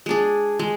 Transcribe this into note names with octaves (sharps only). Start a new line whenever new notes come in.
G#3 D4 G#4
G#3